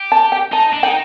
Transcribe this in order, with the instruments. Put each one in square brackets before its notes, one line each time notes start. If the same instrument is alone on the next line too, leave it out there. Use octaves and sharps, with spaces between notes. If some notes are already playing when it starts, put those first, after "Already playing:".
Already playing: [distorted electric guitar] G4
[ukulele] A5
G5
[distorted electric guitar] D#4 [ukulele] A5
[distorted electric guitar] D4
[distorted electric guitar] D#4 [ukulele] G5